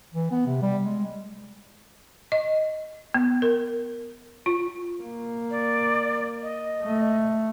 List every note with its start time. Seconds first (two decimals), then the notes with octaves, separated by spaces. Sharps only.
0.14 E3
0.31 B3
0.47 C3
0.62 G3
0.85 G#3
2.32 D#5
3.14 B3
3.42 A#4
4.46 F4
5.01 A#3
5.51 D5
6.42 D#5
6.83 A3